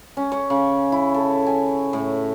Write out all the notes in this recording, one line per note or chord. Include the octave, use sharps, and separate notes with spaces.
C#4
C#5
C#3
E4
A4
G#5
A2